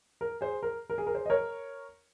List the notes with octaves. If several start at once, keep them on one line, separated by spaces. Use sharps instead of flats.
A#4
G#4 C5
A#4
A#4
G#4
A#4
G#4 C5
D#5
A#4 C#5